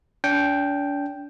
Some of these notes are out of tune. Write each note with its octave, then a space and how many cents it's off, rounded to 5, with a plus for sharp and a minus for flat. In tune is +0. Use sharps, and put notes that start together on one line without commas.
D4 -40 G5 +0